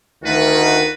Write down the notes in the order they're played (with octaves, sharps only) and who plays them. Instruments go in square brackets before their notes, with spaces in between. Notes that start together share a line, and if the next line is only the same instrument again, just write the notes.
[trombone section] D2 D#3 [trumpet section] F4 F#4 B4